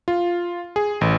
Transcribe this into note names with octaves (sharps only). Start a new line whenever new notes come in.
F4
G#4
A1